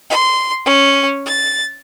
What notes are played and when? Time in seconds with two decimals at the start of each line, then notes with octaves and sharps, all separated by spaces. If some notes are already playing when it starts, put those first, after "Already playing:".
0.10 C6
0.65 C#4
1.24 A6